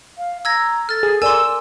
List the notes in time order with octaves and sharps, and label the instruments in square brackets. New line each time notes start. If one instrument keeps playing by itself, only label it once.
[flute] F5
[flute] A#5 [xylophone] E6 G#6 A#6
[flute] A4 [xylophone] F6 A6
[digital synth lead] G#4
[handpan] A#4 D5 [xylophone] G#5 C6 [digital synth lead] E6